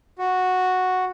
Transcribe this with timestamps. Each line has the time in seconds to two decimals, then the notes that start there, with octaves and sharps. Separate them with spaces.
0.18 F#4